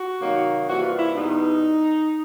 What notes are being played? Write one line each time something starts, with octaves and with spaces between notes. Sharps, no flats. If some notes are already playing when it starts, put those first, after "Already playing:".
Already playing: F#4
C3 D#3 F#3 A#3 D#4
C3 E3 G3 A#3 F#4
F4
E4
E2 B2 G3 D#4